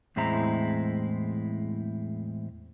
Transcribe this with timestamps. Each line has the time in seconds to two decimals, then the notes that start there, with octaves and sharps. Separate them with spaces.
0.16 E2 A2 G#3 C4 E4 A#5